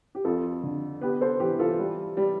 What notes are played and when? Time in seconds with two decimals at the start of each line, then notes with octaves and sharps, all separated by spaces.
0.15 G4
0.25 F2 F4 A4
0.63 D3
1.01 B3 G4 B4
1.21 A4 C5
1.40 E3 G4 B4
1.59 F4 A4
1.79 G3
2.17 G3